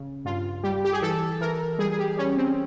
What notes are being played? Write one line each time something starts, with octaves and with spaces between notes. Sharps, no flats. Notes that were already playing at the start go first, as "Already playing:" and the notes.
Already playing: C#3
G2 F4
G3 G4
G4
G#4
E3 A4
E3 A#4
G3 G#4
G#4
G4
G3 C#4
C4